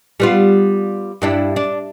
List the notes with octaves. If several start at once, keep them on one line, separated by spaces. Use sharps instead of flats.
G3 B3 F4
G2 D4 E4
D4